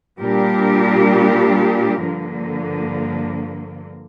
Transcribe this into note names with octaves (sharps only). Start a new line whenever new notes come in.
A#2 G3 D4 G4 A#4
G2 D3 F3 A#3